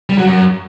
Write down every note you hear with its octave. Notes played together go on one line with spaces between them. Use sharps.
G3
F#3
F#2